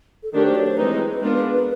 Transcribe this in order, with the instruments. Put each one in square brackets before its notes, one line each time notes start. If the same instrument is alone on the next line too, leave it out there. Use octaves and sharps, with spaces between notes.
[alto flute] A4
[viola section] D#3 F#3 A3 D4 G4 [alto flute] A#4
[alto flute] C5
C#5
C5
[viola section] E3 G#3 C4 D#4 [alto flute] B4
[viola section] G#3 B3 D4 F4 A#4